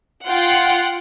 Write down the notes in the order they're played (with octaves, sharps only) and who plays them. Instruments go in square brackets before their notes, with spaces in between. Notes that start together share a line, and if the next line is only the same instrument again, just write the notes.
[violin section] F4 F#5 G5